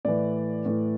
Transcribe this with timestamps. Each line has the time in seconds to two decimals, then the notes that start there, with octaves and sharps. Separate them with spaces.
0.05 A2 E3 D5
0.66 A2 E3